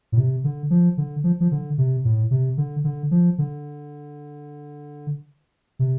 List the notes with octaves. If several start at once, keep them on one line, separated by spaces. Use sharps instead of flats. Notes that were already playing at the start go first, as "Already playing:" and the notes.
A2
C3
D3
F3
D3
F3
F3
D3
C3
A2
C3
D3
D3
F3
D3
C3